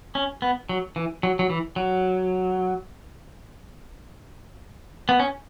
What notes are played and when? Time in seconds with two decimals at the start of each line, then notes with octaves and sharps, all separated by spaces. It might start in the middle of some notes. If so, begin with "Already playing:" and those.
0.15 C#4
0.42 B3
0.69 F#3
0.96 E3
1.23 F#3
1.39 F#3
1.50 E3
1.76 F#3
5.09 B3
5.20 C#4